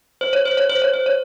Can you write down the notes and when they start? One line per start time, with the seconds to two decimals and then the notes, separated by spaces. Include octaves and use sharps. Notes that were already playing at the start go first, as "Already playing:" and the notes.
0.21 C5
0.33 C#5
0.45 C5
0.57 C#5
0.70 C5
0.82 C#5
0.93 C5
1.06 C#5